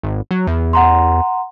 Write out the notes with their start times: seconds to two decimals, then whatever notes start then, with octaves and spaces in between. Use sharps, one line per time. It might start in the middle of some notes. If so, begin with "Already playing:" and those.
0.03 G#1
0.31 F#3
0.47 E2
0.73 F#5 A#5 C6